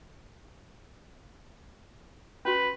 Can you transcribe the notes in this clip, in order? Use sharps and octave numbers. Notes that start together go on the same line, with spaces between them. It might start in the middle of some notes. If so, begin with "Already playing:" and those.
C#4 F#4 B4